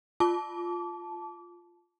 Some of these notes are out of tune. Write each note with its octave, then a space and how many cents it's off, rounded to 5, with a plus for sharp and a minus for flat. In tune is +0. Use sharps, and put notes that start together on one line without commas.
F4 +0 A5 -15 D6 -25